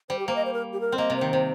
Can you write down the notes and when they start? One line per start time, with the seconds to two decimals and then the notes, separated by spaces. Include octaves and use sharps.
0.09 G3 C5
0.19 G4
0.27 A#3 C5
0.36 D#5
0.45 C5
0.53 A#4
0.73 G4
0.81 A#4
0.92 C4
0.98 A#3 D#5
1.10 C3
1.16 C5
1.21 D#3
1.33 C3